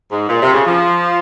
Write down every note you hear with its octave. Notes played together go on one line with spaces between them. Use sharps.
G#2
A#2
C3
C#3
F3